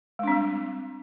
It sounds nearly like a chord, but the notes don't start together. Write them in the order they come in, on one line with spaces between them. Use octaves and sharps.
G#3 D4 C4 G3